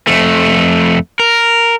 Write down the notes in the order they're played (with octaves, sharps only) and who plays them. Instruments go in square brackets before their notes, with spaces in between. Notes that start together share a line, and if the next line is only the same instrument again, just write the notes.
[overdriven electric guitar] F2 A3
A#4